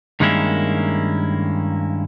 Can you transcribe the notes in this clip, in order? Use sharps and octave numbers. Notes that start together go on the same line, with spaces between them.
G2 D#3 G#3 A#3 C#4 E4